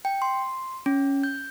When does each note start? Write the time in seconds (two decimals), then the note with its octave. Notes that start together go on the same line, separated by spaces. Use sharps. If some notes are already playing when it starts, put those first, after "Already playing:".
0.05 G5
0.22 C6
0.86 C#4
1.23 G6